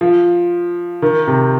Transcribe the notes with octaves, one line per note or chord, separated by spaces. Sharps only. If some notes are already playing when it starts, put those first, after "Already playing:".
F3
D#3
C3